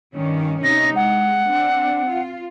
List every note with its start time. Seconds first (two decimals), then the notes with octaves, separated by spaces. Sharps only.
0.15 G2 D#3 C#4
0.64 C3 C#4 D#4 A#6
0.96 G#3 F#5
1.46 C4 D4
2.08 F4